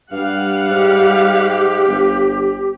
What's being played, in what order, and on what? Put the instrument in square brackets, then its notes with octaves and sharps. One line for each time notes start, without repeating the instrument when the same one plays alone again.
[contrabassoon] G2 [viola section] G3 F5 F#5
[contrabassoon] G#2 [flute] G4
[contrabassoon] G1